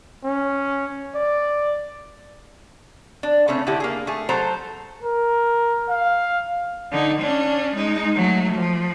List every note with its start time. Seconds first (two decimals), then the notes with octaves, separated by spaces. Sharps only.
0.24 C#4
1.15 D5
3.23 D4
3.48 C#3 A3 C4 C#4
3.67 D3 A3 E4 G4
3.80 A#3 G#4
4.07 A3 G#4
4.29 F#3 A3 A4 C5 A#5
5.03 A#4
5.89 F5
6.92 D3 D#4
7.21 C#4 D4
7.76 G#3 D#4
8.15 F#3 A3
8.54 F3